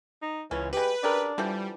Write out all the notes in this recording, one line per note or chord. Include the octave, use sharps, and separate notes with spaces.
D#4
C#2 E3 C#4
G3 G#3 G4 B4
C#3 D4 G4 A#4
D3 E3 F3 G3